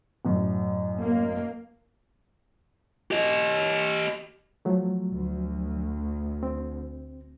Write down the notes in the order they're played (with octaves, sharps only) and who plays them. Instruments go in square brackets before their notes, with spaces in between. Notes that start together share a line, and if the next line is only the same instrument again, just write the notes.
[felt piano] A1 F#2
[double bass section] A#3
[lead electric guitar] G4 D#5
[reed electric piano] F3 F#3 A3
[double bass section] D2
[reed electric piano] C4